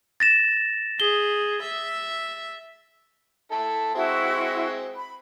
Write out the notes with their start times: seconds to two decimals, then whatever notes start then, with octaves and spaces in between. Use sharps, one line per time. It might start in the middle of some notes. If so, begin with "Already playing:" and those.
0.20 A6 A#6 E7
1.00 G#4 G7
1.62 E5
3.51 E4 A4 A5
3.95 G#3 C4 E4 F#4
4.95 B5